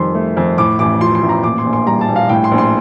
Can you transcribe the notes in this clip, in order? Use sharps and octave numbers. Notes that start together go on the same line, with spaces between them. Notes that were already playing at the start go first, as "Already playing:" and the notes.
Already playing: F2 D#3 G3 C6
A3
F2
A2 D6
A1 D6
F3 C6
C6
A1
A#5
A#2 D6
C6
A#1
C6
G3 A#5
A5
A#1
F5
A2 G5
C6
A#1
C6